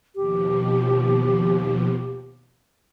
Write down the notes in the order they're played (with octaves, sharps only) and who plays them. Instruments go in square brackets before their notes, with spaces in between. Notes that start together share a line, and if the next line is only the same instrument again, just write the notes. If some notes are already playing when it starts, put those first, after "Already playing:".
[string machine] D#2 B2 F3 [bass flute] G4